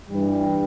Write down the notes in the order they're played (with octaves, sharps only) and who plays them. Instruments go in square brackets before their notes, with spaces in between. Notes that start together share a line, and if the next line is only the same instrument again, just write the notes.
[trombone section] G2 E3 G3